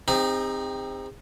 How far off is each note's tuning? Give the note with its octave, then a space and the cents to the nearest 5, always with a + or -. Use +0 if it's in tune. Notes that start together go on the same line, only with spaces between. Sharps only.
C4 +0 D#4 +0 G#4 -45